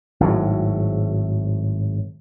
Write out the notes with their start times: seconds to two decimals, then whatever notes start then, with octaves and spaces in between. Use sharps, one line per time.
0.20 G#1 A2 F#3